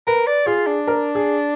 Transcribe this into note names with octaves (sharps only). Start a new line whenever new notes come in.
A#4 B4
D5
F4 G#4
D4
A#4
G#4